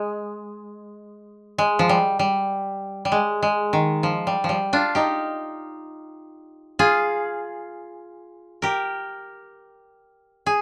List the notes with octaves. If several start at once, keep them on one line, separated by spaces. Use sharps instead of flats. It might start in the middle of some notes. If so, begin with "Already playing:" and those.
Already playing: G#3
G#3
F3
G3
G3
G3
G#3
G#3
D#3
F3
G3
F3
G3
D4 F4
D#4 G4
F4 G#4
G4 A#4
G#4